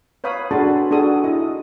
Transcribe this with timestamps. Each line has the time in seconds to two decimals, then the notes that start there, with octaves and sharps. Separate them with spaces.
0.24 B4 C#5 F5 B5 D#6
0.51 D4 F#4 G#4 A4 A5 C6
0.91 D4 F#4 G#4 A4 D#6
1.24 E4 D#5